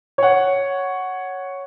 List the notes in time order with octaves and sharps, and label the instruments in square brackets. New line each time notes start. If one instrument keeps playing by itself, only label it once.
[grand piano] C#5 F#5